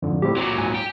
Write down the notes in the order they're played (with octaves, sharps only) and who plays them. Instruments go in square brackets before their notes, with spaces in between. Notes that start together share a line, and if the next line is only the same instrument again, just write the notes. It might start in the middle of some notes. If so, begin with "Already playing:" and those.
[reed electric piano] F2 G#2 D3
[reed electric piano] A2 G3 C4 [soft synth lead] G4
[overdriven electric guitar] A#2 F#3 [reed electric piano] D6
[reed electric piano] G#2 [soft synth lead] G#5
[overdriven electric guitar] G4